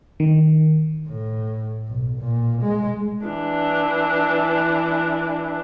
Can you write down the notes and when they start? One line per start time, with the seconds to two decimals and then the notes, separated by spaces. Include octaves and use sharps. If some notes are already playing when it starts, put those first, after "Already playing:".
0.20 D#3
1.08 A2
1.88 B1
2.18 A#2
2.63 G#3
3.26 E3 D4